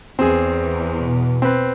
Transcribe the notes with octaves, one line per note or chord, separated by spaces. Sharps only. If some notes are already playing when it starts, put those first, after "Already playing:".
E2 C4 G#4
B2
C4 B4